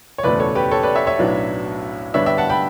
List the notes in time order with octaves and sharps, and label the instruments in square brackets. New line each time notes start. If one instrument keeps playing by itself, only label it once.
[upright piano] C#5
F#1 E2 B2 A3 B4 D5
A4 C#5
G4 B4
A4 C#5
B4 D5
C#5 E5
C#5 E5
B1 A2 F#3 B3 D4
G2 D3 G3 B3 D4 C#5 E5
E5 G5
F#5 A5
G5 B5